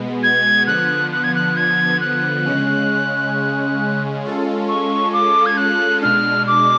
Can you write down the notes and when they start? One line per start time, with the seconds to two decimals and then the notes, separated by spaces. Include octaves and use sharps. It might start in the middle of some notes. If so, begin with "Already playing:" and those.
Already playing: B2 G#3 B3
0.23 G#6
0.67 D3 F3 B3 F#6
1.13 F#6
1.24 G#6
1.35 F#6
1.57 G#6
2.01 F#6
2.46 C#3 G#3 C#4
4.25 G#3 C#4 F4 A4
4.68 C#6
5.13 D6
5.46 G#6
5.57 F#6
6.02 B2 G#3 D4 F6
6.48 D6